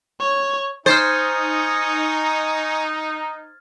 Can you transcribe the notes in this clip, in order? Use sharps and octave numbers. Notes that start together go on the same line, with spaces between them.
C#5
D#4 C5 G#5 C#6 D#6 F6 G#6 A6